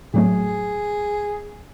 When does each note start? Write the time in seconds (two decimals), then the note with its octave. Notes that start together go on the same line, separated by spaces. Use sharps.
0.14 A2 F#3 A3 G#4